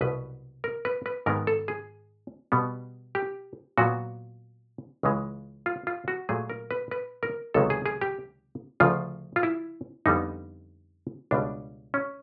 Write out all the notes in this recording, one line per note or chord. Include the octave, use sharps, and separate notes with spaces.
C2 B2 F#3 B3 B4
A#4
B4
B4
G#2 D#3 G#3 B3 A#4
A4
G#4
B2 G3 B3
G4
A#2 F#3 B3 F#4
C#2 C#3 E3 G#3
F4
F4
F#4
A#2 F#3 A3 G#4
A#4
B4
B4
A#4
C#2 C3 D#3 F#3 B3 A4
G#4
G#4
G4
D2 C#3 F3 F4
F4
E4
F2 D3 G3 B3 D#4
C#2 B2 G3 D4
C#4